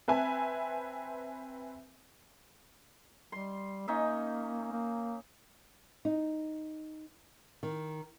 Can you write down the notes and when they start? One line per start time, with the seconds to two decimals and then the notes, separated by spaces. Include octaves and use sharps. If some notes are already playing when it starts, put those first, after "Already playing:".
0.08 C4 B4 E5 G#5 A5
3.32 G3 C6
3.88 A#3 C#4 D#4 E5
4.72 A#3
6.05 D#4
7.63 D#3